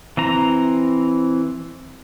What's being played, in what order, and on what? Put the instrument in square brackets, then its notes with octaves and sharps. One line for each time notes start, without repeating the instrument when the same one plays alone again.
[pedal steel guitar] E3 C4 A#5